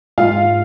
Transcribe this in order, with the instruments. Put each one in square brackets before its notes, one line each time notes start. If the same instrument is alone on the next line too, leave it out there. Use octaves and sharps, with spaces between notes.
[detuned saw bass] G#2 [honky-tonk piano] F4 F5